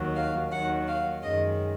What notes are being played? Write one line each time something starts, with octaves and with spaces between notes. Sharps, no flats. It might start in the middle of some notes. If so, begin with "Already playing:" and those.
Already playing: D#2 D#3 F#3
F5
D#2 D#3 F#3 F#5
F5
F#2 D#3 G#3 D#5